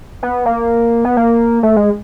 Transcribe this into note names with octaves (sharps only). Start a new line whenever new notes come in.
B3
A#3
B3
A#3
A3
G#3